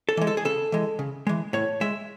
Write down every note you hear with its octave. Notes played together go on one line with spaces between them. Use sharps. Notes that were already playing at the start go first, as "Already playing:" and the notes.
A4
E3 G#3
A4
G#4
C#3 A4
E3 G#3
C#3
E3 G#3
A2 C#5
G#3 E5